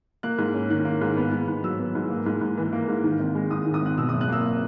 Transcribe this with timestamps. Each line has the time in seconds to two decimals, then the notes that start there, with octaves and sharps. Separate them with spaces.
0.23 A#3 F#6
0.38 G#2
0.54 C#4
0.70 D#3 F#6
0.85 A#3
1.01 G#2
1.17 B3
1.32 G#2
1.48 G#2
1.64 F#3 E6
1.79 B3
1.95 G#2
2.10 A#3
2.26 G#2
2.41 G#2
2.57 E3
2.73 A#3
2.88 G#2
3.04 D#3
3.19 G#1
3.35 G#3
3.51 G#2 D#6
3.66 D#3
3.74 D#6
3.82 G#1 F#6
3.98 B2 E6
4.09 F#1 D#6
4.21 F#6
4.29 A#3 E6